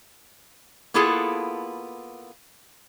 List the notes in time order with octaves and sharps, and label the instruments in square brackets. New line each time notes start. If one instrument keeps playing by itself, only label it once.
[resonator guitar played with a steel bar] A#3 B3 E4 F4 G#4 A4